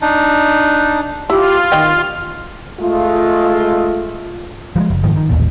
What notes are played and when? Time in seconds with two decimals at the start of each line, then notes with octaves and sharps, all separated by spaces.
0.01 D4 D#4
1.30 E4 F4 G4
1.72 D#3 C#5 D#5 G5
2.79 G#3 A3 F4
4.76 F3 F#3 G#3
4.90 F#1
5.03 G#2 D#3 F3
5.16 D#3
5.29 A1 D#2 A#2